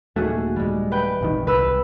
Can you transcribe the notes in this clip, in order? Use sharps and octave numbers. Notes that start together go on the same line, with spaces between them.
D#1 D#2 A3 F#4 G#4
G3 G#3
B4 G5
D#1 G#1 D#3
C2 B4 E6